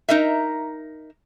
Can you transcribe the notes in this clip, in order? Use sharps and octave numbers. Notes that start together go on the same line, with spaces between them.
D#4 A#4 D#5 E5